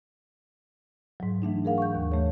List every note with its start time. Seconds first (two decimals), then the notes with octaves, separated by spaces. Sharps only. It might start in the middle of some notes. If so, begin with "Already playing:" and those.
1.20 G#2 F#3
1.42 E3 A3 D4 D#4
1.65 G#4 A#4 F5 F#5
1.78 C#6 G6
1.95 D#2
2.12 E3 A3 C#5